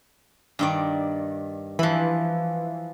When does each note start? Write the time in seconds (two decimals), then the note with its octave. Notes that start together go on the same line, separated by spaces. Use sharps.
0.59 G2 D#3 D5
1.79 E3 F3 B5